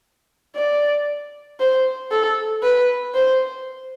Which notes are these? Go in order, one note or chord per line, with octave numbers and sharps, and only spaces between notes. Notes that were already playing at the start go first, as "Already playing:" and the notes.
D5
C5
A4
B4
C5